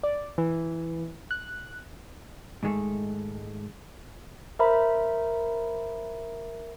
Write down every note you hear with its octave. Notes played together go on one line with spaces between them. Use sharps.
D5
E3
F#6
G#2 D#3 G#3 A3
A#4 C5 E5 A#5 B5